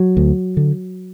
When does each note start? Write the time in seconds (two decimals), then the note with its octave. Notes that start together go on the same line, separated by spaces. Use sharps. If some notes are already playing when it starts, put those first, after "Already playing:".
Already playing: F#3
0.17 D2
0.57 D3